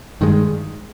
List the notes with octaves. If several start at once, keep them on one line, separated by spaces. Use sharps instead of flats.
G2 D#3 G#3